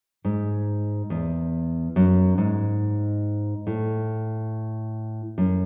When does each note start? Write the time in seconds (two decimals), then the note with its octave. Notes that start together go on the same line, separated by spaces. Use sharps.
0.25 G#2
1.10 E2
1.96 F#2
2.38 G#2
3.67 A2
5.38 F#2